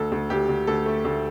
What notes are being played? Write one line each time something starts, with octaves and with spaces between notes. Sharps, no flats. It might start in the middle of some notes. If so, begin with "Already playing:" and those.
Already playing: D2 A4
D2
D2 G4
D2
D2 A4
A3
D2